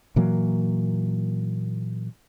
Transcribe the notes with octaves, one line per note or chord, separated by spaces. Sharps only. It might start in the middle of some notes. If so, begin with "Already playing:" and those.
A#2 E3 F#3 A#3